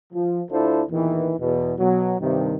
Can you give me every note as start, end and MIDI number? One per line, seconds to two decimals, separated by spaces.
0.13 0.41 53
0.50 0.81 38
0.50 0.81 62
0.50 0.81 64
0.50 0.81 65
0.50 0.81 69
0.50 0.81 72
0.90 1.33 40
0.90 1.33 46
0.90 1.33 51
0.90 1.33 52
1.40 1.73 40
1.40 1.73 47
1.79 2.15 47
1.79 2.15 54
2.20 2.56 43
2.20 2.56 48
2.20 2.56 51